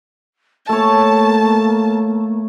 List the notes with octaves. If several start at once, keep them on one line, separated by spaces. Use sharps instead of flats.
A3 A#3 C#5 A5